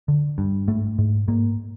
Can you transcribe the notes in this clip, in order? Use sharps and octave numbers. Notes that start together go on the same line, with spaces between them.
D3
G2
G#2 A3
G#2
G#2 A#3